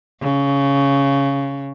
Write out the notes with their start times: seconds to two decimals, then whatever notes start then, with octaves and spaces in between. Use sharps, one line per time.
0.21 C#3